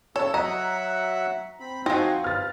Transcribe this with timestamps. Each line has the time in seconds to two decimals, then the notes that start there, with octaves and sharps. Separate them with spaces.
0.16 C#3 A4 C#5 E6
0.34 F#3 D#5 E5 F#5 A#5
1.60 C4 B5
1.86 F3 C4 D#4 F#4 G5 G#5 A#6
2.24 B4 F6 A6